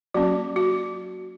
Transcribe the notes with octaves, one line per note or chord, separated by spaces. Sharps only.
F#3 A#3 C#4 F#4
F#4